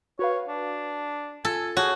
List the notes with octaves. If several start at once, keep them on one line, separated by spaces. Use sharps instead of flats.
F#4 B4 C#5 F5
D4
F4 A4 G#5
F#4 G#4 C#5 A5 G6